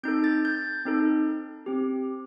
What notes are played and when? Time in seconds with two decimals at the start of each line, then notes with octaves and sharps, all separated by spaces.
0.03 C4 D#4 A4 G6
0.24 A6
0.45 G6
0.85 C4 D#4 A4
1.66 C4 G4